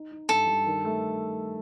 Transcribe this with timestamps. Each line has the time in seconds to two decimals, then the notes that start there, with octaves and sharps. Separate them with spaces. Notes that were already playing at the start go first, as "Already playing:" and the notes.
Already playing: D#4
0.11 D#4
0.29 G2 A4
0.47 G2
0.66 D#3
0.84 A3